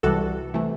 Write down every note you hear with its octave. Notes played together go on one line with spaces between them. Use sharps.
C2 C3 E3 G3 F#4 A4
C3 E3 A3